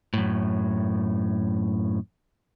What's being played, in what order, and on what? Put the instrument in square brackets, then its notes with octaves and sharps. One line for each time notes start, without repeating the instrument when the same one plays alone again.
[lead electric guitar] F#2 A2